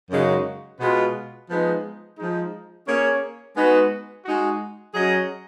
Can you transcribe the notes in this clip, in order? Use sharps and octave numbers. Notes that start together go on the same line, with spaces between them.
F#2 C#3 G#3 D#4 F#4
B2 G#3 B3 F4 B4
F3 G#3 B3 D#4
F3 G#3 D#4
A#3 C#4 G#4 C#5
G#3 B3 D#4 F#4 B4
G#3 D#4 F#4
F#3 C#4 G#4 D#5